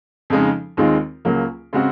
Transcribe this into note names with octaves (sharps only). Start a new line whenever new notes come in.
F2 C#3 G#3 D#4
D#2 D#3 G#3 C4 F4
C#2 C#3 F#3 A#3
C#3 G#3 C4 F#4